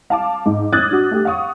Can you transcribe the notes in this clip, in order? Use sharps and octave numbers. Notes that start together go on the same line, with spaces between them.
F5 A5 D6
G#2
D6 D#6 F6 F#6 G#6 A6
D4 F#4
A3 G4
F5 F#5 C#6 D#6